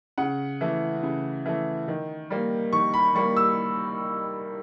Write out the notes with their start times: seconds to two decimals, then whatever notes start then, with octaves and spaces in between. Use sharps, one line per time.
0.18 C#3 F#5
0.61 E3 A3
1.03 C#3
1.45 E3 A3
1.88 D#3
2.30 G3 A#3
2.73 D#3 C#6
2.94 B5
3.15 G3 A#3 C#6
3.37 E6